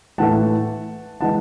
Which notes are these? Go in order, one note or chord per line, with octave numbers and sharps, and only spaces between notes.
A2 E3 A3 F#5 A5
E3 G#3 F#5 A5